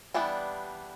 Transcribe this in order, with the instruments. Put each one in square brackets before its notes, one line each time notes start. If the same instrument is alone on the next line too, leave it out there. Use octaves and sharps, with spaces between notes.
[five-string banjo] E3 G3 B3 D4